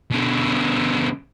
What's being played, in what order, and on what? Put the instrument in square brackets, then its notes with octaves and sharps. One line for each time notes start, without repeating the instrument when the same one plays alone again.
[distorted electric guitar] B2 D3